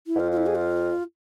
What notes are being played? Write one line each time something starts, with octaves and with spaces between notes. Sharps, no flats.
E4
G#2
F2 F4
F4
E4
G#4
F4